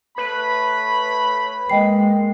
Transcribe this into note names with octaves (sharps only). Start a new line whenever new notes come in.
A3 B4 C#5 B5
G#3 A#3 D#5 G5 C7